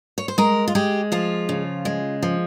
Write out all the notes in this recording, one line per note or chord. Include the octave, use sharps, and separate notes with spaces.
C#5
C5
G#3 A#4
F4
G#3 G4
F3 F4
C#3
G#3
F3